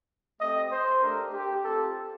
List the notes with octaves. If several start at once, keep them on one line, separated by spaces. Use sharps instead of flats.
A3 C4 G4 D#5
C5
A3 D4 G4 A#4
G4
C4 F4 A4